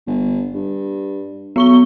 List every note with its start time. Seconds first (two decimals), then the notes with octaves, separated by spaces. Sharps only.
0.07 G1
0.54 G2
1.56 F#3 B3 C#6 G7